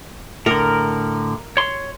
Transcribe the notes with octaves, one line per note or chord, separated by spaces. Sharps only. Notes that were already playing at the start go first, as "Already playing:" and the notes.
A2 D3 A#4
C#5 C6